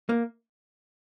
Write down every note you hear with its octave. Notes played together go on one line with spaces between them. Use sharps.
A#3